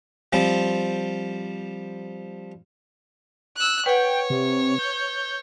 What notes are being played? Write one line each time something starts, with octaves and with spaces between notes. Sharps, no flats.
F3 G3 C4
E6 F#6
B4 C#5 F#5 G5
C3
G6